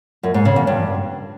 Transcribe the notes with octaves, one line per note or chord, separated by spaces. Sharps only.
F#2
G#2
C#3
E2
G2